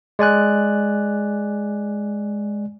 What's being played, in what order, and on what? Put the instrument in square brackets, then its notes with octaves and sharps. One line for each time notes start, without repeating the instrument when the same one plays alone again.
[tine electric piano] G#3 D5 G#5 F#6